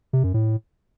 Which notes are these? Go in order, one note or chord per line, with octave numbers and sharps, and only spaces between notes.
C3
F#2
A2